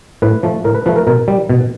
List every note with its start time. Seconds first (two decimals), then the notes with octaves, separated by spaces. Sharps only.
0.22 A2 B4
0.43 F3 A3
0.64 A2 A#4
0.75 B4
0.86 F3 A3 B4
0.96 A#4
1.07 B2 A#4
1.28 G3
1.50 B2